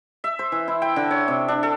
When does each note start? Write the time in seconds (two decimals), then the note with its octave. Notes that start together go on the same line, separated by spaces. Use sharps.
0.24 E5
0.39 C5
0.52 E3
0.68 E4
0.82 G5
0.96 D3
1.11 C#5
1.28 C3
1.48 D4
1.63 A4